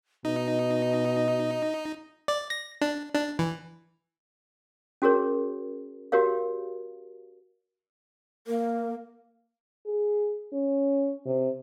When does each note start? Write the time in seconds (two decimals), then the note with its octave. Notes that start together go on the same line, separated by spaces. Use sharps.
0.25 B2 D#4 D#5
2.28 D5
2.50 A#6
2.81 D4
3.15 D4
3.39 E3
5.02 C#4 F#4 G#4 A#4 C#5
6.12 F#4 G4 A#4 C#5 F5
8.47 A#3 A#4
9.87 G#4
10.53 C#4
11.26 C3